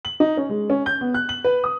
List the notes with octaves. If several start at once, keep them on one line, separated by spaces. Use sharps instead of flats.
F#7
D#4
C#4
G#3
C#4
G6
B3
F#6
F#7
B4
D#6